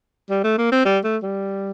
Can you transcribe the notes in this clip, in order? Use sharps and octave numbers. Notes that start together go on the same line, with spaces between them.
G3
A3
A#3
C4
G3
A3
G3